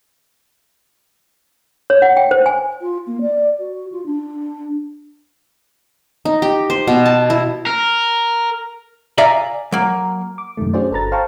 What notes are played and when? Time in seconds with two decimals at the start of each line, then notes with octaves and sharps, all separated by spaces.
1.90 C#5
2.02 F#5
2.17 G5
2.31 C5
2.46 G#5
2.81 F4
3.06 A#3
3.21 D5
3.59 F#4
3.92 F4
4.06 D4
6.25 D#4
6.42 G4
6.70 C5
6.87 B2
7.06 A5
7.30 E4
7.66 A#4
9.18 D5 E5 F5 G#5 A#5
9.72 F#3 A#3
10.38 D6
10.57 F#2 C3 D#3 A3
10.74 C#4 D4 F#4 G#4 C5 D5
10.91 G1 A4 B4 A#5 A6
11.12 C5 F5 G5 A5 A#5 C#6